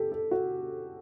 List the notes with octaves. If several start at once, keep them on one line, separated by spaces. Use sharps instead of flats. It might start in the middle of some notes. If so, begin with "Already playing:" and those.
Already playing: G4 A4
A4
F#4